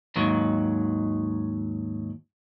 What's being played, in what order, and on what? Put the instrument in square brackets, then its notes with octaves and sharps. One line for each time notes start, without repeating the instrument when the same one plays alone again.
[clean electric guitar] D#2 G#2 D#3 F#3